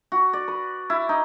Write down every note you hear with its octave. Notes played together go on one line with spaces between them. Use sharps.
F#4
D5
B4
E4
D#4